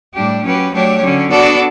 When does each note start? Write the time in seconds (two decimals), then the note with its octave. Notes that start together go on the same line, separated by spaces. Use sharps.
0.14 A2 G3 D4 G4
0.43 F#3 C#4 G4 B4
0.72 F#3 A3 D4 G4 C#5
1.01 D3 F#3 C#4
1.29 B3 D4 F#4 A4 D5